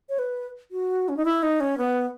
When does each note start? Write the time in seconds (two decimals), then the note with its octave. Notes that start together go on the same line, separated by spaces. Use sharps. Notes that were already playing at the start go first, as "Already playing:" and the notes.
0.09 C#5
0.19 B4
0.71 F#4
1.09 C#4
1.17 D#4
1.25 E4
1.43 D#4
1.60 C#4
1.78 B3